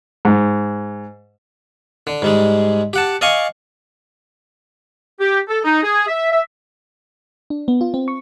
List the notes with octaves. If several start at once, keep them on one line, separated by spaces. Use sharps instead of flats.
G#2
D3
G#2 G3 G#3
G4 F#5 A5
D5 D#5 F5 G#5 C#6
G4
A4
D#4
G#4
E5
E5
D4
B3
F4
C4
C#6